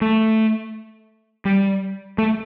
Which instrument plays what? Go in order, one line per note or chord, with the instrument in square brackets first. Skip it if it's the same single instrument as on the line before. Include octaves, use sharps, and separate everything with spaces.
[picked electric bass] A3
G3
A3